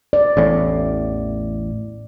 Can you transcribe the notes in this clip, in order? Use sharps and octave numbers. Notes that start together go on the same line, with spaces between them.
D5
A1 E2 A2